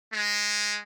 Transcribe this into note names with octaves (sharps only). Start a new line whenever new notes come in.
G#3